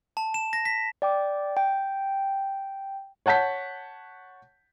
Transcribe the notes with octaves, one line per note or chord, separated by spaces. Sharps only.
A5
E7
A#6
B6
D5 G5 D6
G5
C#5 F#5 A5 G6 B6